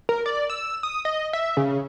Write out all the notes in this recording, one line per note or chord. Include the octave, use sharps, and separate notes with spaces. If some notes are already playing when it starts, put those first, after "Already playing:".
A#4
D5
E6
D#6
D#5
E5
C#3